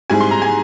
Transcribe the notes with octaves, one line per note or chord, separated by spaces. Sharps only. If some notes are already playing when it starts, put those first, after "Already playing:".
G#2 G3 C4 E4 G#5
C6
A#5
G#5